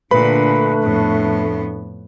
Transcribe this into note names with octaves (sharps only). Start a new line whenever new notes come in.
A#2 D3 A3 D4 B4 B5
F2 A2 B3